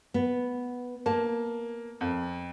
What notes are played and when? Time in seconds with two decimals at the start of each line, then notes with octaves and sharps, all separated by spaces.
0.14 B3
1.06 A#3 A5
2.01 F2